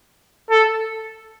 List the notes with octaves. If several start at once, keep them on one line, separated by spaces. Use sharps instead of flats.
A4